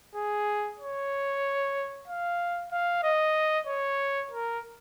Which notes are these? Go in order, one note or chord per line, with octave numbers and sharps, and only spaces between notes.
G#4
C#5
F5
F5
D#5
C#5
A#4